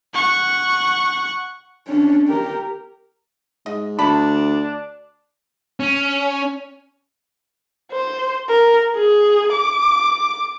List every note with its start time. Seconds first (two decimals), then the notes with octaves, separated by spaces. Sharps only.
0.14 F#5 C#6
1.88 C#4 D4
2.28 G4 A#4
3.66 G#2 D#5
3.99 D2 D4 A5 B5
5.80 C#4
7.92 C5
8.49 A#4
8.96 G#4
9.53 D6